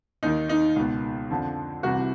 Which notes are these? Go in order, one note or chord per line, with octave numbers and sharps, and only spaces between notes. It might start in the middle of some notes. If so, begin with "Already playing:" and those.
D#2 D#3 D#4
D#4
C#2 B2
F2 D3 F3
C2 C3 E3 F#4